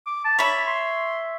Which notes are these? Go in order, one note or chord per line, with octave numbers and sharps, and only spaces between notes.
D6
A5
C#5 E5 B5
C6